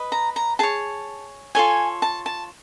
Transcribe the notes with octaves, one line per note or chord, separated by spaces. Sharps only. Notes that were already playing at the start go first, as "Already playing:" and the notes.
Already playing: B4 D#5
A#5
A#5
G#4 C#5 A5
F4 A4 C#5 G#5
A5
A5